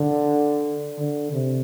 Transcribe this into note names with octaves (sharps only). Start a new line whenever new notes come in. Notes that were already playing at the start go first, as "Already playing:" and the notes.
Already playing: D3
D3
C3